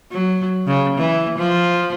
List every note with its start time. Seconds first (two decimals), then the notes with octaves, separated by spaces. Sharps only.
0.11 F#3
0.67 C#3
0.97 E3
1.38 F3